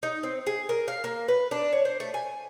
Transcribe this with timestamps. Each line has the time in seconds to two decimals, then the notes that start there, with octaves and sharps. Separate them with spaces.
0.03 D#4
0.23 C4
0.47 G#4
0.69 A#4
0.88 F5
1.04 A#3
1.28 B4
1.51 D4
1.73 C#5
1.85 C5
2.00 A3
2.14 G#5